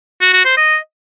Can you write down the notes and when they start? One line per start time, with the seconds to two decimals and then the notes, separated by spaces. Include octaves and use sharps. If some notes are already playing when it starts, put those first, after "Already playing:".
0.22 F#4
0.33 F#4
0.45 C5
0.57 D#5